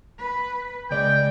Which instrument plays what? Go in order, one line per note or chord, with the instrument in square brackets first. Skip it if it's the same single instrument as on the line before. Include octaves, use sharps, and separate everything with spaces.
[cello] B4
[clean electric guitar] C#2 D5 [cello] G#3 [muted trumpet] G5